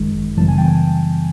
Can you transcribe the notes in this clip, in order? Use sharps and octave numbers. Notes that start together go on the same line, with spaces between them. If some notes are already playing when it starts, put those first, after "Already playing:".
Already playing: G#1 F#2 D#3 G#3
F#2 C#3 E3 G3 B3 A5
G#5
G5 A5